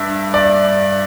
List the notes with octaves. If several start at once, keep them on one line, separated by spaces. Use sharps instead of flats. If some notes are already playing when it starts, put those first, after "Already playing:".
Already playing: G2 E5
D5